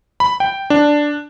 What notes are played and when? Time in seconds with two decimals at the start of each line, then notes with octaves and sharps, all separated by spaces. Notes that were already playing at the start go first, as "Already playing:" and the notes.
0.20 B5
0.40 G5
0.70 D4